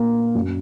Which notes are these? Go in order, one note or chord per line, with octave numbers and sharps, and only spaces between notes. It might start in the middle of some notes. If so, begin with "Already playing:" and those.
Already playing: A#2 A#3
F#2